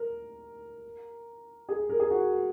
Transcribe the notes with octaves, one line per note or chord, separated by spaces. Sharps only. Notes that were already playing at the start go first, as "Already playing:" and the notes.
Already playing: A#4
G#4
A#4
G#4
F#4